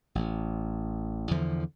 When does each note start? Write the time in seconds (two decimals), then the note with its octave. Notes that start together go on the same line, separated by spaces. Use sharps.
0.15 A1
1.31 E2 D3 F3